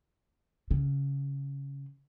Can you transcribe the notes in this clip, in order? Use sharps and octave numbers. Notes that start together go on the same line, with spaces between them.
C#3